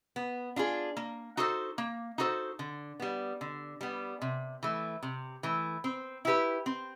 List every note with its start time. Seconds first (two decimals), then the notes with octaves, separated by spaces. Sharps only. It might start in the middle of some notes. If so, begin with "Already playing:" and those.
0.16 B3
0.56 D4 F4 G#4
0.97 A#3
1.37 D#4 F#4 A4 C5
1.78 A#3
2.18 D#4 F#4 A4 C5
2.59 D3
3.00 G3 B3
3.41 D3
3.81 G3 B3
4.21 C3
4.63 E3 A3
5.03 C3
5.43 E3 A3
5.84 C4
6.25 E4 G4 B4
6.66 C4